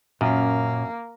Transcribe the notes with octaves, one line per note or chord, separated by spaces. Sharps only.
F#2 A#2 A#3 C#4